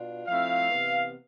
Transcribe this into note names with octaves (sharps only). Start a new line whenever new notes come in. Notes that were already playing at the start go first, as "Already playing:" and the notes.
Already playing: B2 D4 F4
F3 A3 C4 E4 F5
C3 E3 B3